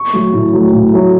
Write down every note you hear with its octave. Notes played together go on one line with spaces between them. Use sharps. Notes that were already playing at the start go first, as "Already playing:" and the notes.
Already playing: C#6
F#3 A3
A2
F#3 A3
A2
F#3 A3